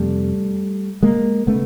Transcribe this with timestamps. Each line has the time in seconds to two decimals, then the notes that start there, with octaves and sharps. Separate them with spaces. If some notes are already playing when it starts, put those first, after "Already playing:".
Already playing: F2 C3 G3 A3
1.03 G#3 A#3
1.47 C#3 A3 B3